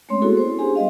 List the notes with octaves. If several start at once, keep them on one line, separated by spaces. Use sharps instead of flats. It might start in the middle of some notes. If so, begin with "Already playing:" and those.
G#3 A3 C4 C#4 C#5 C6
A#3 B3 E4 F#4 G#4 A4
C5
C#4 D4 G4 G#4 G#5 C6
G3 B3 D#5 F5